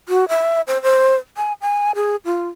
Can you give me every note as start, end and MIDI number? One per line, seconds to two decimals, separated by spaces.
0.09 0.28 66
0.29 0.61 76
0.68 0.82 72
0.83 1.16 72
1.37 1.53 80
1.61 1.92 80
1.95 2.16 68
2.25 2.48 65